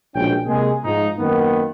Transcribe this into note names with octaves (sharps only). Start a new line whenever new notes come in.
A#1 B2 G#3 C#4 G5
C3 G#3 A#3 G#4
G#2 F3 D#4
F#2 D#3 A#3 B3